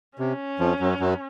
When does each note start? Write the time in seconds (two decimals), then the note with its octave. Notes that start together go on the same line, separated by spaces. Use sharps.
0.18 C3 C#4
0.59 F2 F3
0.80 F#2 F#3
1.00 F#2 F#3